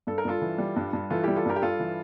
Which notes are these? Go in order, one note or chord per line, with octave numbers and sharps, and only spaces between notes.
G2 A4
A#4
G2 F4 A4
E3
G3
G2
G2
E3 F4 A4
G3 E4 G4
F4 A4
G2 G4 A#4
G4
G2 F4 A4
E3